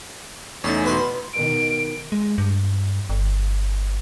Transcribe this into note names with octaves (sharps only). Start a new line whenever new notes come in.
E2 A3 C#4 D#4 A5
B2 B4 C6
B2 D#3 D7
G#3
G2
G1